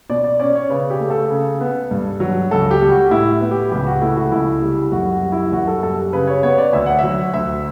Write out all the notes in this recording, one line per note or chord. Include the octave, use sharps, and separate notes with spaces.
B2 D5
D5
C#4 D5
C#5
C#3 B4
G4
A3
A4
C#3
B3
G2
F#3
C#2 A4
G4
G3
F#4
A2 E4
B3
G4
C#2 G4
F#4
A3 E4
F#4
C#2 E4
G3
F#2 F#4
F#4
G3
E4
F#2 F#4
A4
G3 A4
C#3 B4
C#5
B3 C#5
D5
D2 E5
F#5
F#3 E5
D2 E5